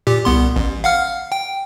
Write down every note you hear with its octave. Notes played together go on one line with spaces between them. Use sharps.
A#2 G4
C2 B3 C6
A1
F5 F#5 F6
G5